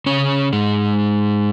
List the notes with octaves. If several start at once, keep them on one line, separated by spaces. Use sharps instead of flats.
C#3 C#4
G#2 G#3